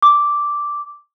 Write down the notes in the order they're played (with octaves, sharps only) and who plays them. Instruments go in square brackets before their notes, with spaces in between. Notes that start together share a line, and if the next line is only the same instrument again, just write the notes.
[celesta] D6